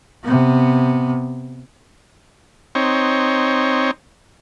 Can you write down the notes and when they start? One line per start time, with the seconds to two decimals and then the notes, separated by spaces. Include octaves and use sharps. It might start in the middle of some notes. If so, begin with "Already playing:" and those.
0.24 C3 B3
2.75 C4 D#4 C#5